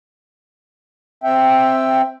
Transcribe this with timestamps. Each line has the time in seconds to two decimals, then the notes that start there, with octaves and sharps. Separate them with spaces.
1.24 C4 E5 G5